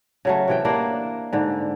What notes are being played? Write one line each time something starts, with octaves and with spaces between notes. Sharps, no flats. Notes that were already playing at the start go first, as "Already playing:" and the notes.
C#3 F#3 A3
C3 E3 G5
A#3 D4 E4
G#2 D3